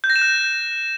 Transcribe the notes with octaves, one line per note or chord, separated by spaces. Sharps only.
G6
A#6
E7
F#6